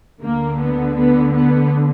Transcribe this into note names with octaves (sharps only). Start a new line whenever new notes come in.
D2 D3 A#3
B3
B3
B3